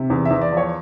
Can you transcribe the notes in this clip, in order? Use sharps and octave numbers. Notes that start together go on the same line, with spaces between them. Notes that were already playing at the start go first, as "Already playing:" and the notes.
Already playing: C3
E2
E2 E5
D5
F3 C#5